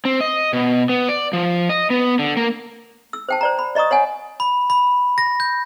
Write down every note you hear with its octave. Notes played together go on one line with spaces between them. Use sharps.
C4
D#5
B2
B3
D5
F3
D#5
B3
D3
A#3
E6
C5 G5 A5
C5 D5 A#5
B5
D5 D#5 A#5 C#6 D#6
C#5 F#5 G#5
B5
B5
A#6
G6